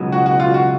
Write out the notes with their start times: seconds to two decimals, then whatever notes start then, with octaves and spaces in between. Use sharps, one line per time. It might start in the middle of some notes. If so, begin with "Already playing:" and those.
Already playing: C#2 B2 F#3 B3
0.12 F#4
0.26 F#4
0.40 F4
0.54 F#4